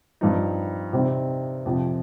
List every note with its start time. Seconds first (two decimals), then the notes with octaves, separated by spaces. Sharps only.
0.21 G2 F3 C4 D#4
0.93 C3 G3 C4 D#4
1.66 F2 C3 F3